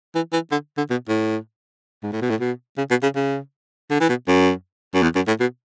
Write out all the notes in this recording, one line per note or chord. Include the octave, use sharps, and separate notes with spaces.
E3
E3
D3
D3
B2
A2
G#2
A2
B2
A2
B2
C#3
B2
C#3
C#3
D3
E3
B2
F#2
F#2
E2
F#2
A2
B2